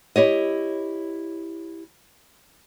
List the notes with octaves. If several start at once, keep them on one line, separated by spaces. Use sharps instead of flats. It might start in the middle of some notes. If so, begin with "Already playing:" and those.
E4 G4 C#5 D#5